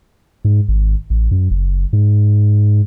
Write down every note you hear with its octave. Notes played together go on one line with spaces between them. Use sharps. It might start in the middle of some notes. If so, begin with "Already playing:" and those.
G#2
G#1
A1
F#2
F#1
G#2